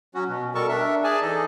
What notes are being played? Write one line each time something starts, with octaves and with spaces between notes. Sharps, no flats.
F#3 C#4 F#4
B2
B2 G3 A4 A#4 A5 C#6
D4 A#4 E5
G#4 D5 G#5 A5
E3 D#4 A4 D#5